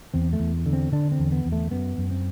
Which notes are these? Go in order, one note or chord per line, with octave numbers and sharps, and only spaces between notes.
E2 C4
A3
E2
D3
C4
D3 D4
C4
E2
B3
E2
A3
F#2 B3
F#2
C4